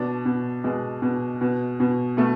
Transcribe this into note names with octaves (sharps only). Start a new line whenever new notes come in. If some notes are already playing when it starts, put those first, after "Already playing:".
Already playing: B2 D4
B2
B2 G#3
B2
B2
B2
B2 A3